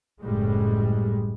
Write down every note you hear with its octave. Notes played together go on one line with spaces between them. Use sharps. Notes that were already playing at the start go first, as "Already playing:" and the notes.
F#1 A2 G3 G#3